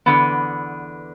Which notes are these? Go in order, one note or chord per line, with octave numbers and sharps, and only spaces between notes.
E2 D3 F3 B3